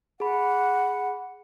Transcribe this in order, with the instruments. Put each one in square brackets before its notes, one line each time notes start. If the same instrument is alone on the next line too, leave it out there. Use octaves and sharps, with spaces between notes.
[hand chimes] G#4 B5 [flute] F#5